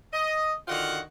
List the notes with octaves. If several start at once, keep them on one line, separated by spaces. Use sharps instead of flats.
D#5
D3 D#3 F4 F#4 F5 F#5